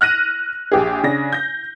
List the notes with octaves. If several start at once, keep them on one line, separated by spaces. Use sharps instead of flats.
F6 F#6 A#6 D#7
A#1 G4 G#4
C#3 D4 A#6
G6 A#6